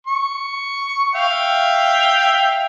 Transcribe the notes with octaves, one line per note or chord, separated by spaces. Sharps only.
C#6
E5 F5 G5